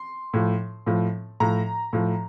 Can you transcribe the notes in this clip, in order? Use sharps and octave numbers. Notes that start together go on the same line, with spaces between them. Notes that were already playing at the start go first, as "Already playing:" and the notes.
Already playing: C6
A2 F3
A2 F3
A2 F3 A#5
A2 F3